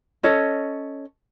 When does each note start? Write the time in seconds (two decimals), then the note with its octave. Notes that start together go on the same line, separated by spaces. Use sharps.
0.23 C#4 A4 C#5 D#5